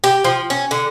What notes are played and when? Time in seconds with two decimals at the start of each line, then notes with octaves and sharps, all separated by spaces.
0.04 G4
0.24 F3
0.50 C#4
0.71 D3